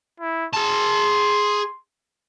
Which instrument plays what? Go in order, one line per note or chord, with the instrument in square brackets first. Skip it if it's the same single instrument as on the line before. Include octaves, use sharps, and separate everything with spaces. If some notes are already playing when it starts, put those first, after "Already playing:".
[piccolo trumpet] E4
[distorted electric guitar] G#4 A5 [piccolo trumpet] C6